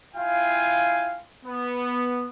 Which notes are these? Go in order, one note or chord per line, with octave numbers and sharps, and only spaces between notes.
E4 F4 F5 G5 G#5
B3